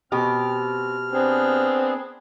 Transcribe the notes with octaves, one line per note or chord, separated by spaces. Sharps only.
B2 C4 G4 F6
B3 C4 D4 G#4